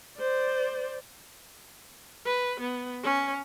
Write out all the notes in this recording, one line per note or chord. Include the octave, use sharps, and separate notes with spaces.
C5 D5
B4
B3
C#4